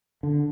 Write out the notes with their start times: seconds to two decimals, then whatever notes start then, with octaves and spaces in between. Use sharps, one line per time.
0.23 D3